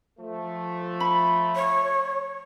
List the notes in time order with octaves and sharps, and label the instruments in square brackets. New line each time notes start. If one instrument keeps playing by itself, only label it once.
[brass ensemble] F3 A3
[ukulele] B5
[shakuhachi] C#5